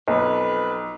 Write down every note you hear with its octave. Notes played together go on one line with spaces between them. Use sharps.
B1 F2 B4